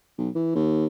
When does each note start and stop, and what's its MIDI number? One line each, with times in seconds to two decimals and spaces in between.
0.18 0.29 35
0.35 0.51 52
0.55 0.86 39